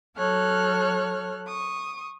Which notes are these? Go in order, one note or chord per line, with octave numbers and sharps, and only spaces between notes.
F#3 A4 C#5 F6 F#6
C#6 D#6